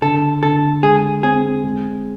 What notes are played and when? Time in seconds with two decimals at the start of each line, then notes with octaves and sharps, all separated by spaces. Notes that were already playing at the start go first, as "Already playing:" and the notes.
0.02 D3 A4
0.43 D3 A4
0.83 G#3 G#4
1.23 C4 G#4
1.64 G#3